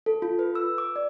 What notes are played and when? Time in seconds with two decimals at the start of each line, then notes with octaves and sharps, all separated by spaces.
0.06 A4
0.22 F4
0.39 B4
0.55 E6
0.78 D6
0.96 D5